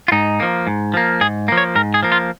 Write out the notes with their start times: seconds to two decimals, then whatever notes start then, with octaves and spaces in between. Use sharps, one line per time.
0.08 F4
0.12 G#2 D#4
0.40 F3 A#3
0.67 G#2
0.94 F3 A#3
1.21 G#2 G#4
1.48 F3 A#3
1.57 C#5
1.75 G#2 A#4
1.94 G#4
2.03 F3 A#3
2.12 F4